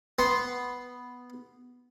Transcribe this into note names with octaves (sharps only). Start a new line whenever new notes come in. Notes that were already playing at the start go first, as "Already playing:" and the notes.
B3 C6